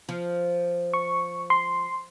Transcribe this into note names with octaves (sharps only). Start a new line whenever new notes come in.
F3
C#6
C6